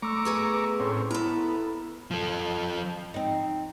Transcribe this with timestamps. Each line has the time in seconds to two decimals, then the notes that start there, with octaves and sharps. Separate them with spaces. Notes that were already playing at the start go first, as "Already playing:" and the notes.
0.02 A3 A#5 C#6 D6 E6
0.25 B3 G#4 E5
0.80 A2 C4 C#4
1.11 B3 E4 A4 A#5
2.11 F3 A4
3.14 C4 D#4